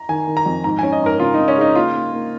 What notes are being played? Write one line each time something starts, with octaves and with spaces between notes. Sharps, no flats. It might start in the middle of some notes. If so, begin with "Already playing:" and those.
Already playing: A#5
D#3 G#5
D#3
A#5
F2
G#2 A#5
C#4 G#5
D#5
G#2 A#4
C#3 F4
C#3 D#4
C#4
D#4 G#4
A#3 F4
A#3
A#3